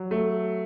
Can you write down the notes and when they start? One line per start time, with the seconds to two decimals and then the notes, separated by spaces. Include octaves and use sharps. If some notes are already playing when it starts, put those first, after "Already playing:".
Already playing: F#3
0.11 A3